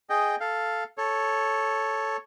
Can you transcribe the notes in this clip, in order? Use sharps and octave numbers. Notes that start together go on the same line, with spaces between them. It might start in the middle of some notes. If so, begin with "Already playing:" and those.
G#4 D#5 G5
A4 F5
A4 C#5